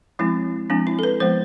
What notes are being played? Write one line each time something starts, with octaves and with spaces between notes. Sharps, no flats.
F3 G#3 C4 E4
F3 G#3 C4 D4
E4
A4
B4
F3 G#3 B3 C5